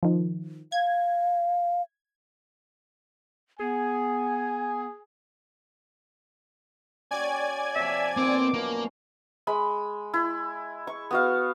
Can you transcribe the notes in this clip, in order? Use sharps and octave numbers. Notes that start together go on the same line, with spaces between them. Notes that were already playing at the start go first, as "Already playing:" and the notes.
D#3 F3
F5 G#6
B3 G#4 G#5
C#4 F#4 D5 G5 G#5 G#6
C3 F3 E5
A#2 D#3 B3 C4 D6
F#2 F3 A#3 D5
G#3 B5
E4
C#6
B3 F#4 F5